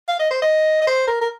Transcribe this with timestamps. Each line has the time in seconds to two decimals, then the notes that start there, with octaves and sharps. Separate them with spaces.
0.08 F5
0.19 D#5
0.31 C5
0.42 D#5
0.81 D#5
0.87 C5
1.07 A#4
1.21 A#4